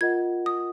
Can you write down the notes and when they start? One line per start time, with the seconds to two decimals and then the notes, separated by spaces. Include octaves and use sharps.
0.01 F4 A#4 D#5 F#5 G#6
0.46 D#6